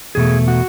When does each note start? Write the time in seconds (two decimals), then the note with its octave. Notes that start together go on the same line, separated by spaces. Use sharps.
0.15 E2 B2 A3 G#4
0.48 F#4